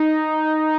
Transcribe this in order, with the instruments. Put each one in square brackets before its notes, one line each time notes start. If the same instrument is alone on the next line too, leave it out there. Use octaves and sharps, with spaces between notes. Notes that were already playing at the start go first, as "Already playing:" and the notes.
Already playing: [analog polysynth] D#4